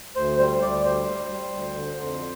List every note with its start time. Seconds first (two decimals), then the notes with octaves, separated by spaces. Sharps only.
0.15 D2 C5
0.39 G3 C5
0.62 D2 D5
0.85 G3 C5
1.09 G3
1.31 G3
1.54 D2
1.77 D3
2.00 F2